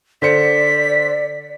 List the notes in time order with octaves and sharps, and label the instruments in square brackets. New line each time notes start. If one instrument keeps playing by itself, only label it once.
[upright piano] D3 C5 C#7 [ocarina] D5 [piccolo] B6